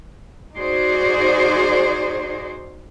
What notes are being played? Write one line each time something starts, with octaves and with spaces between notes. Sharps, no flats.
D#4 F#4 G#4 C5 D5